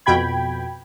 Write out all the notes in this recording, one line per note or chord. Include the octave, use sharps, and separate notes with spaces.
F2 B2 G5 B5 G#6